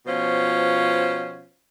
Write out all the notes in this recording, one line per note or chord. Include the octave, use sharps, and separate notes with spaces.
B2 F3 C#4 F4 C5